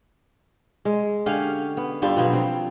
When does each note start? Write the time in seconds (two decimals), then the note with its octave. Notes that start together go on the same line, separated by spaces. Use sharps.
0.85 G#3
1.26 D3 C#4 G4 F5
1.77 B3
2.02 G2 G3 F4 A4
2.17 B2 F3 F#3 B3
2.33 C4